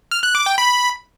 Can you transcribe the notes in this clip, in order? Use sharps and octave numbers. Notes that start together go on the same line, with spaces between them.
F6
F#6
D6
G5
B5